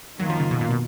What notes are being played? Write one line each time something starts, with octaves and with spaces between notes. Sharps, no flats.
F#2 D#3 F#3 A#3 F4
F3
C#3
B2
A#2
B2